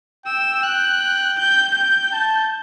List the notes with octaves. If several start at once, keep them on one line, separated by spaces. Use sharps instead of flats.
G5 E6
G5 F#6
G6
G5 G6
A5